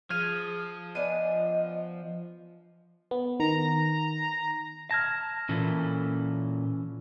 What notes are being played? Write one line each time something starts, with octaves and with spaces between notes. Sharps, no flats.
F3 G#4 F6 G#6 D#7
B3 D4 D#5 G#5 D#7
B3
D#3 A#5
A5 F6 G#6 A#6
A#2 E3 C#4 A4